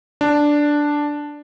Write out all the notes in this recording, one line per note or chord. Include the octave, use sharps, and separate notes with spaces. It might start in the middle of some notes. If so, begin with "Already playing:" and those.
D4